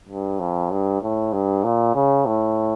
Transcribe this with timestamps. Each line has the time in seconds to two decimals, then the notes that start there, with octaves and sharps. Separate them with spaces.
0.09 G2
0.39 F2
0.71 G2
1.02 A2
1.33 G2
1.64 A#2
1.95 C#3
2.26 A2